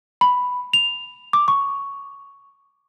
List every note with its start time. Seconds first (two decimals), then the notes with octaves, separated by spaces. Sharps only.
0.21 B5
0.73 F7
1.33 D6
1.48 C#6